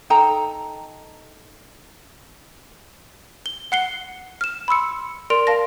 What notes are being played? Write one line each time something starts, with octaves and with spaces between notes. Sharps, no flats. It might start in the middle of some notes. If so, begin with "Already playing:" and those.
D#4 A4 G5 A#5
G7
F#5 F#6 C7 C#7 G7
F6 E7
B5 C6 E6 C#7
A#4 D5 C6 D7 F7
A#4 F5 A5 A#6